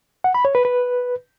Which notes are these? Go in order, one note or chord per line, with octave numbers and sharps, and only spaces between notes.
F#5
B5
C#5
B4
B4